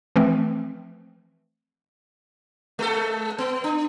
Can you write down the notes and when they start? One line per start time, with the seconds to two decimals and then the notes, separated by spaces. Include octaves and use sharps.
0.16 E3 F3 A3 C4
2.79 G#3 A4
3.38 B3
3.64 D4